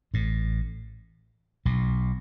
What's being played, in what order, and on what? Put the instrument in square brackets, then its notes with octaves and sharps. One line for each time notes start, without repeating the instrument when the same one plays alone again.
[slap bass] A1 A2
B1 B2